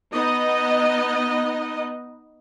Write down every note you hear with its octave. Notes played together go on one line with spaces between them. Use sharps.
B3 D#4 D#5